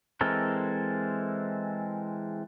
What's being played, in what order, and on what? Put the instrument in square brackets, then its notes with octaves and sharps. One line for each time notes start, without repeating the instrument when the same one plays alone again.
[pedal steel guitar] E3 G#3 C4 A4 A#4